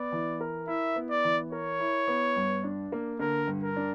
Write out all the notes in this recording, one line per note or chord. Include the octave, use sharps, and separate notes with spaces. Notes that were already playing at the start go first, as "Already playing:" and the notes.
Already playing: B3 D5
E3
A#4
E4 E5
B3
D5
E3
A#4 C#5
E4
B3
G2
D4
A#3
D3 A#4
G2
A#4
D4